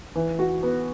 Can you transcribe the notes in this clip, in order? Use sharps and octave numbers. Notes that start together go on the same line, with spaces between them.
E3
F#4
B3